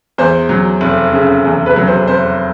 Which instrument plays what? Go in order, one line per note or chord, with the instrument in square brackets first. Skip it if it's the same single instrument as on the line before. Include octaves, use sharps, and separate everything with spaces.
[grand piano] E2 C5
F#3
F1
C#3
E2
B4
F#3
C5
F1 C5